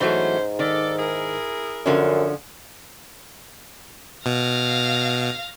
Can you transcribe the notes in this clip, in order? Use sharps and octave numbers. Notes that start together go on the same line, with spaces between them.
G#2 E3 F#3 A3 C#4 C5
D#3 A4 D5
E4 G#4 A#4
F#2 D3 F3 C#4
B2 F5 A#6